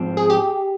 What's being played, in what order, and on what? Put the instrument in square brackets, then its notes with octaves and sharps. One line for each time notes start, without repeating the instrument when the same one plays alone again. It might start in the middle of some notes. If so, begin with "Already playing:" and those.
Already playing: [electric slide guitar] G#2 F3 C4
[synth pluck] G#4
G4